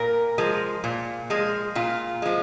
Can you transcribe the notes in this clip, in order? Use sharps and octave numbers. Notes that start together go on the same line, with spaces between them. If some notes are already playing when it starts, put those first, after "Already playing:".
Already playing: A#2 A#4
F3 G#3
A#2
F3 G#3
A#2 F4
F3 G#3